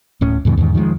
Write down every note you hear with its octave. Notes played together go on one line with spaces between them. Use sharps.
D1 A2 C#4
E2 G#2 B2 D#3
E2 G#2 D#3
D#3 F3 F#3 G#3